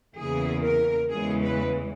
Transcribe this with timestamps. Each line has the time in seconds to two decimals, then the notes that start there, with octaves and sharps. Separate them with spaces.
0.18 E2 C#3 E3 A#3 G#4
0.64 A#4
1.11 E2 C#3 E3 G#3 G#4
1.44 B4